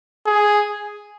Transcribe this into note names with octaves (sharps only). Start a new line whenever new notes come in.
G#4